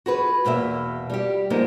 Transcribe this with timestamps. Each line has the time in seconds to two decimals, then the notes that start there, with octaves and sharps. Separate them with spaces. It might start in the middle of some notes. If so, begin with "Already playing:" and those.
0.06 F#4 G#4 B4
0.45 E2 B2 A#3 E5
1.10 G3 G4
1.50 F3 G#3 A#3 B3 D#4